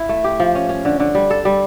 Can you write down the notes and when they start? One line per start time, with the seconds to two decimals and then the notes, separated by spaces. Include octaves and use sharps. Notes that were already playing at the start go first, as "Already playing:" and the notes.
Already playing: E4
0.09 A3
0.24 G4
0.40 F3
0.55 C#4
0.69 C#4
0.85 D3
1.00 D3
1.15 G3
1.30 A4
1.45 G3